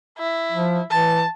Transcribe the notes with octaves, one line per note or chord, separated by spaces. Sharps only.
E4
F3
E3 A5